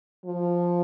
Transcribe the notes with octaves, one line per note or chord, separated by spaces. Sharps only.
F3